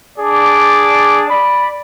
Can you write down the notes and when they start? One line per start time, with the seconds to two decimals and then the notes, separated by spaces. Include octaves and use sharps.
0.19 D4 G#4 D5 A5 D6
1.30 D5 B5